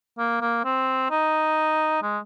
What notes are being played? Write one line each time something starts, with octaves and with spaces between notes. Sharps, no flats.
A#3
A#3
C4
D#4
G#3